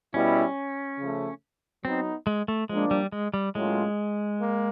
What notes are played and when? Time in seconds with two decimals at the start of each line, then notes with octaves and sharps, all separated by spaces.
0.14 B2 G3 B3 C#4 E4
0.99 C#3 F3 A3
1.84 F#3 B3 C4 D#4
2.27 G#3
2.48 A3
2.69 F3 G#3 A#3 D4
2.91 G3
3.12 G#3
3.34 G3
3.55 A2 F#3 G#3 A#3 C#4 F4
4.39 A#3